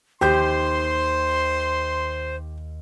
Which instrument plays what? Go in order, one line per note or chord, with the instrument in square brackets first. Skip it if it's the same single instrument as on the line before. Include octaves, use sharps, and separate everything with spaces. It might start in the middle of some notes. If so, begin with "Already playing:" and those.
[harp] D#2 [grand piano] G4 G6 [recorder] C5 [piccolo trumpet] C6